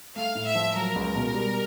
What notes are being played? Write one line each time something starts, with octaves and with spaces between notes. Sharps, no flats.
A3 F5
A2
E5
F3
F#3 A#4
C#2
B2
G3